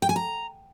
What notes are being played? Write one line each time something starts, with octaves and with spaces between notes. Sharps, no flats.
G5
G#5
A#5